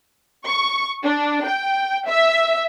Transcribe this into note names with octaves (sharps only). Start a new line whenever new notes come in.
C#6
D4
G5
E5